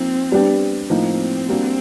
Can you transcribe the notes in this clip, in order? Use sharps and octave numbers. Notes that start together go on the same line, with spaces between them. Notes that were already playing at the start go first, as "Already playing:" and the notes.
Already playing: F3 A#3 C4 D#4
G3 B3 D4 G4
A2 F3 A#3 C4 D#4
G3 A#3 D4 F#4